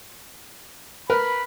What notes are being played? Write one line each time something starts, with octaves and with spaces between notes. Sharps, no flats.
A#4 B4 B5